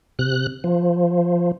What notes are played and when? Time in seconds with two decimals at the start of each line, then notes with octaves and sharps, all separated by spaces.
0.19 C3 F#6
0.64 F3